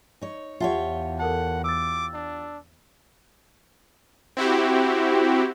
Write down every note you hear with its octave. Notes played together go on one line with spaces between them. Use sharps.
D#4 C#5
E2 F4 G4 C#5 E5 F#5 A5
A4 A#4 F#5 A5
D6 E6 A6
D4
C4 E4 F#4 G4